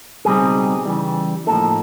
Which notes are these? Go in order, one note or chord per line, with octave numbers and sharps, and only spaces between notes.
C#2 B2 G3 C4 D#4 G#4
C#3 E3 G3
A2 F3 A#3 D#4 A4